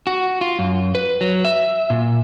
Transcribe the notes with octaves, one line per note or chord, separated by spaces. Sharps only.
F#4
F4
F#2
B4
F#3
E5
A#2